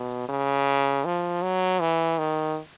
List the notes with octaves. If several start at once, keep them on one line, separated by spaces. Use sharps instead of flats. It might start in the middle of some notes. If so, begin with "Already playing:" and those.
Already playing: B2
C#3
F3
F#3
E3
D#3